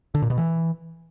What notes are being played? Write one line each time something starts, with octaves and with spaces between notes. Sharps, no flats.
D3
A#2
B2
E3